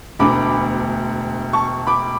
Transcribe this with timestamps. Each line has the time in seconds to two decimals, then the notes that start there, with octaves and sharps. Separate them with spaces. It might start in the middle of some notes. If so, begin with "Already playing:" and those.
0.19 E1 D2 D3 B5 D6
1.53 A5 C#6
1.87 B5 D6